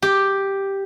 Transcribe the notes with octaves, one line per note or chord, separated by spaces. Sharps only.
G4